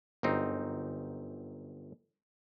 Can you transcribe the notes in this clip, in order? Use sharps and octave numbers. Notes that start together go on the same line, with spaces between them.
G1 F#2 C4 D#4